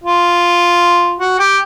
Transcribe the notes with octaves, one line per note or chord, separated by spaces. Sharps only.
F4
F#4
G4